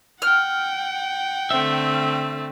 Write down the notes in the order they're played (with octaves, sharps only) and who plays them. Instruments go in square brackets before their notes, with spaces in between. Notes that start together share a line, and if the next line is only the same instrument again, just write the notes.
[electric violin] F#5 G5 [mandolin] F6
[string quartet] D3 A3 C4 [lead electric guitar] E5